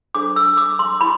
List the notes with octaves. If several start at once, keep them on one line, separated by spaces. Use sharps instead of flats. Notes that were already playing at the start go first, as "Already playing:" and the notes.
D4 A4 C5 D6
E6
D6
C6
E4 B5